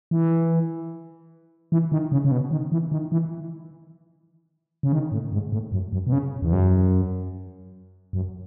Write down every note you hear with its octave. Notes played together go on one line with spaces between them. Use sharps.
E3
E3
D#3
C#3
C#3
B2
D#3
E3
D#3
E3
C#3
D#3
A2
G#2
A2
F#2
F#2
B2
C#3
E2
F#2
F#2